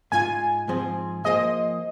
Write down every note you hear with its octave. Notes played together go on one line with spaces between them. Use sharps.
G#2 G#3 F4 G#5
G#2 F3 C4 G#4 C5
F3 A#3 G#4 C5 D#5